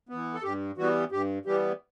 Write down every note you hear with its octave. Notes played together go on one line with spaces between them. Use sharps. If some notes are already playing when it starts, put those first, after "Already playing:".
E3 B3
A4
G2 G4
E3 G3 B3 F#4
G2 G4
E3 G3 B3 G4